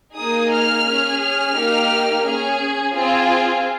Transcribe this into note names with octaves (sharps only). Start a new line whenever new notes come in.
A#3 D#4 G#4 D#6
F6
C#4 G#4
F6
A#3 D#4 G4
C#4 G#4
C4 F4 G#4